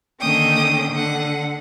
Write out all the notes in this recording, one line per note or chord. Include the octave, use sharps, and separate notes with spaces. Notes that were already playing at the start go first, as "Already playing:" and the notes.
D3 D#3 A#3 C#4 G5 D#6
D3 F#5